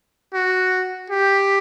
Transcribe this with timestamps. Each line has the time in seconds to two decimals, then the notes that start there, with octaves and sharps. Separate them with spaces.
0.33 F#4
1.10 G4